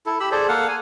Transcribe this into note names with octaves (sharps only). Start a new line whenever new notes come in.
E4 A4
G4 B5 E6
G#4 A4 C5 D5
A#3 A4 F5 F#5
G#5